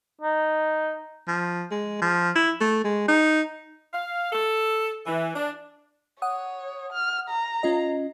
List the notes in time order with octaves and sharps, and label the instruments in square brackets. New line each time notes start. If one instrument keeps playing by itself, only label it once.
[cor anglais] D#4
[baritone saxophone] F3
G#3
F3
E4
A3
G#3
D#4
[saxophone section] F5
A4
E3
D4
[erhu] C#5 [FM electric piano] F#5 D#6
[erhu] F6
A#5
[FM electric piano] C#4 F4 D#5